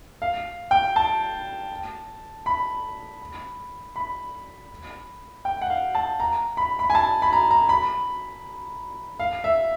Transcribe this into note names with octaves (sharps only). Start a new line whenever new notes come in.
F5
G5
A5
B5
B5
G5
F#5
F5
A5
A#5
B5
B5
G#5
A5
B5
A#5
A#5
B5
F5
E5